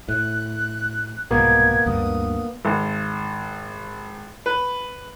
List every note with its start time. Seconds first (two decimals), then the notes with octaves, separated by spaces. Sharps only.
0.09 A2 F#6
1.31 C2 G#2 B2 A#3 B3 G#6
1.86 D2 G2 D3 D#6
2.65 G#1
4.46 B4